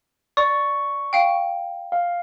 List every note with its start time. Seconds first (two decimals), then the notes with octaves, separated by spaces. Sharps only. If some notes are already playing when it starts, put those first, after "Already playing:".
0.37 D5 C#6
1.13 F5 G5
1.92 F5